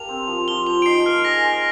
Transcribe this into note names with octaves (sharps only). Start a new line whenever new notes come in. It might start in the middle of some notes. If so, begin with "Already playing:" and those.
Already playing: D4 G4 A#4 F5 F7
C4
F3
F4 G7
C5 F7
D7
D#4 C7
A#3 F6
G#4 A#6
C5